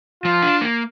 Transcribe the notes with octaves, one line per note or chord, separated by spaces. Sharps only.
F3 F4
D4
A#3